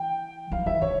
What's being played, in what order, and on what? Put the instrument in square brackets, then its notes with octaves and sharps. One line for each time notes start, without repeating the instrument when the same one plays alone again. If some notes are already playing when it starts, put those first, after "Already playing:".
Already playing: [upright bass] E3 [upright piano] G5
[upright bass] F3 [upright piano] F5
[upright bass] E3 [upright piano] E5
[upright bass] C#3 [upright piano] C#5